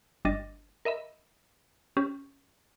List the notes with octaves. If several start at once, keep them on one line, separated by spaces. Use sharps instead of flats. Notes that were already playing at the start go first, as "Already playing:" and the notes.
G1 G3 D4 D#5 A6 A#6
A#4 D#5 E5 B5
C#4 G4